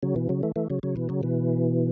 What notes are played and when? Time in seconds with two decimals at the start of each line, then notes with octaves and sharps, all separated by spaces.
0.03 C#3 F#3
0.16 B2 E3
0.29 C#3 F#3
0.43 E3 A3
0.56 E3 A3
0.70 C#3 F#3
0.83 C#3 F#3
0.96 B2 E3
1.09 C#3 F#3
1.23 B2 E3